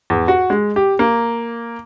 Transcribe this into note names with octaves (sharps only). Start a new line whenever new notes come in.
E2
F#4
G#3
G4
A#3